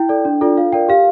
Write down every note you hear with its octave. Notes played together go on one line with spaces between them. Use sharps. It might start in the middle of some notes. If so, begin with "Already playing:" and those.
Already playing: E4 G5
A4 D5
D4
F4 A4 D5
F4 F5
A#4 D5 G5
G4 F5